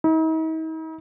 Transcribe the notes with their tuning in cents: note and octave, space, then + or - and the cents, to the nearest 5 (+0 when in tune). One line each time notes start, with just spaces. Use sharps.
D#4 +45